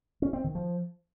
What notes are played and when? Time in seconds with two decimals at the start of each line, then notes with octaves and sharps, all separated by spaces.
0.22 C#4
0.33 C4
0.44 D#3
0.55 F3